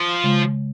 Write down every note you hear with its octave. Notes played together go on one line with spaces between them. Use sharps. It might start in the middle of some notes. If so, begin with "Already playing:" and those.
Already playing: F3
C#3 G#3